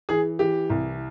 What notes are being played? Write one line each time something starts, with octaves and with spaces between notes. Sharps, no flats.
E3 G#4
E3 G4
C2